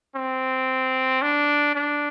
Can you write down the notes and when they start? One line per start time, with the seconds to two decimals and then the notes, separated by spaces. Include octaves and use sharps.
0.16 C4
1.22 D4
1.75 D4